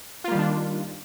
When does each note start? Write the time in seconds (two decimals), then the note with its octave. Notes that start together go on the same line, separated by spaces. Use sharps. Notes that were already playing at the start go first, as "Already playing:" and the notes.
0.24 F4
0.28 A#3
0.31 G3
0.35 D#3
0.39 D4